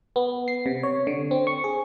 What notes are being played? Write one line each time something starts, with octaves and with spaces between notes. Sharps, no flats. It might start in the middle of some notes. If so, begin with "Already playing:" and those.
B3
C7
C3
C#5
D3
C4
C#6
G#4